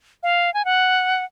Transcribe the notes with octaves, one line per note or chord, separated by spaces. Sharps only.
F5
G#5
F#5